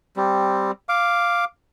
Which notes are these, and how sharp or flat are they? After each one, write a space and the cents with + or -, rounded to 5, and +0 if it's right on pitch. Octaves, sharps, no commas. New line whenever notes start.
G3 +0 C4 +0
F5 +0 D6 +0